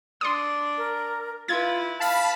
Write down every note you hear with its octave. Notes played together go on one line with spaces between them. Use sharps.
D4 D5 C6 D#6
A#4
E4 F4 B4 G#6 A6
F5 A5 B5